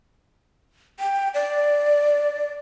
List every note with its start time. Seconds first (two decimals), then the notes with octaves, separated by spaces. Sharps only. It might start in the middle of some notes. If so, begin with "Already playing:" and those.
0.99 G5
1.34 D5